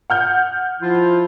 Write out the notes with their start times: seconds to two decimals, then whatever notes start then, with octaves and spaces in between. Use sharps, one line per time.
0.10 F#5 F6 G6
0.81 F3 E4 F4